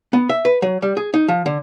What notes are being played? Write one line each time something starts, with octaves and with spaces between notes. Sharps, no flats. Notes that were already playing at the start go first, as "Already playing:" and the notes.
B3
E5
B4
F#3
G3
G#4
D#4
F3
D3